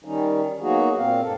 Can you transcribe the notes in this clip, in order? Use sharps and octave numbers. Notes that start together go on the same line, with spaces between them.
D#3 G3 C#4 D#4
F#3 A#3 B3 D#4 F#4 G#4
A#2 C4 F5
G2 A#3 A4